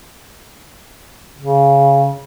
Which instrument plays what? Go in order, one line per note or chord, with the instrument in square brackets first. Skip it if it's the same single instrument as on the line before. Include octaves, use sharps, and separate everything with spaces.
[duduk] C#3